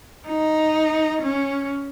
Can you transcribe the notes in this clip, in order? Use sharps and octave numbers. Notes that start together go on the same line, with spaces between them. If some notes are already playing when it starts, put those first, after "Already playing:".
D#4
C#4